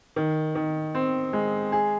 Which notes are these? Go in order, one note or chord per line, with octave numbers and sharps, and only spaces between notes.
D#3
D#3
C4
G#3
G#4